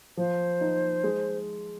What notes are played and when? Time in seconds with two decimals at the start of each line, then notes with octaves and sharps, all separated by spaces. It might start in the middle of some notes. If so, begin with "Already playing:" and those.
0.17 F3 C5
0.61 D#4
1.04 G#3